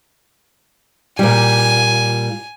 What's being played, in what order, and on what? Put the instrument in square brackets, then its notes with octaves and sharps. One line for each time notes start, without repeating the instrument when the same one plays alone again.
[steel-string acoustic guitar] A#2 G3 [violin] G#5